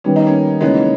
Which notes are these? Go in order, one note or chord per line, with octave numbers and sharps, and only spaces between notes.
D#3 G3 B3 C#4
D#4
A#3 C#4
C#3 E3 G#3 A#3 B3 D#4